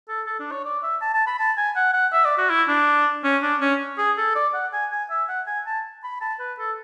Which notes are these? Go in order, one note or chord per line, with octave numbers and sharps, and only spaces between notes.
A4
A4
D4
C#5
D5
E5
A5
A5
B5
A5
G#5
F#5
F#5
E5
D5
F#4
E4
D4
C#4
D4
C#4
G#4
A4
D5
F#5
G#5
G#5
E5
F#5
G#5
A5
B5
A5
B4
A4